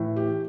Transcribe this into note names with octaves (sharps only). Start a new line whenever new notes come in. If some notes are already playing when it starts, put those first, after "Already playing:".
Already playing: A2 E3
G4